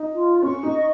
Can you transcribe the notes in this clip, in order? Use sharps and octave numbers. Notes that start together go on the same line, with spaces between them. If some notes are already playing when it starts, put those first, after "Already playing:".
Already playing: D#4
F4
C#4 C#6
D#4
D#5